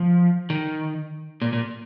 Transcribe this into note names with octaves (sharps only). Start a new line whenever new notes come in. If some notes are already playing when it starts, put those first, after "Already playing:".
Already playing: F3
D#3
A#2
A#2